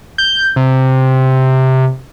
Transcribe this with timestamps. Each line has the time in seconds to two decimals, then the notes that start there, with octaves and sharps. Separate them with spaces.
0.18 G6
0.56 C3